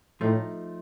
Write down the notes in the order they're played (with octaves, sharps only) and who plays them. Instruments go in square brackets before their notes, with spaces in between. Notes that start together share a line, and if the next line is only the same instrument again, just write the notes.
[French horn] A2 [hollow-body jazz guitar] F3 A3 D#4